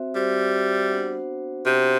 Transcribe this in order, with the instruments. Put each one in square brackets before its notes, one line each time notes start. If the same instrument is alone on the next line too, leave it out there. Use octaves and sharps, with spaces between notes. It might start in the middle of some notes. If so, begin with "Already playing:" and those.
Already playing: [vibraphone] C4 F#4 C5 E5
[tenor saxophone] G3 [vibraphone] C4 F#4 C5 E5
[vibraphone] B3 D4 F#4 C5 F#5
[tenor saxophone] C3 [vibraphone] B3 D4 F#4 C5 F#5